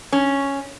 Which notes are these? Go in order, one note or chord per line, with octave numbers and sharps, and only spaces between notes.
C#4